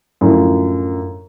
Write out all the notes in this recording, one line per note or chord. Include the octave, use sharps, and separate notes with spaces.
F#2 A2 D3 F3